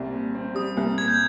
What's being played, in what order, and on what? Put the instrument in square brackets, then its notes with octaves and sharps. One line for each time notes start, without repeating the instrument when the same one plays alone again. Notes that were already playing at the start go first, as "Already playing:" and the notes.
Already playing: [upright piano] C2 G3 C4
A#2
C4
[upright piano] G3 [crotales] D#6
[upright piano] C2
[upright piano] A#2 [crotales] G#6
[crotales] G6